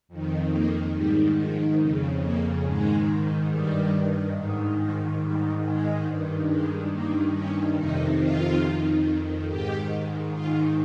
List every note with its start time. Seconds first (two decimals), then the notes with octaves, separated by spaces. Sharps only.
0.08 F2 D#3
0.51 A#3
0.94 G#2 D#3 G3
1.37 F3
1.79 F2 C#3
2.22 A#3
2.64 G#2 D#3 G#3
3.50 G2 D#3 G3
4.35 G#2 D#3
4.78 F3
5.21 G#2 D#3 G3
5.63 G#3
6.06 G2 D#3
6.49 G#3
6.91 G2 D#3 A#3
7.34 C#4
7.77 F2 C3 D#3 D#4
8.19 F4
8.62 F2 D#3
9.47 G#2 D#3 G4
10.33 G#2 D#3 F4